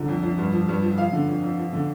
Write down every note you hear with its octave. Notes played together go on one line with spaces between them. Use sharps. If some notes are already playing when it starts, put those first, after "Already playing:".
Already playing: C2 D3 F3
F2
F2
G2
F3
G2
F3
F3 F5
D3
F2
F2
F3
D3